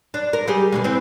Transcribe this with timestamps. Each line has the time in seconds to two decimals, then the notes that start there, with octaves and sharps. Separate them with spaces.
0.14 D4
0.33 A#4
0.47 G3 G4 G#4
0.72 B2 D3 G#3
0.84 E3 C4